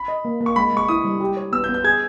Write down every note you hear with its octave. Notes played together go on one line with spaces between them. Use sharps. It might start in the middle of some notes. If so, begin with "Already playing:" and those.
Already playing: B5
D#5
A#3
A#3
C#6
G#3 B5
G#3 C#6
E4 D#6
G3
G4
C#5
B3 E6
G6
B3
G6
G#4 G#6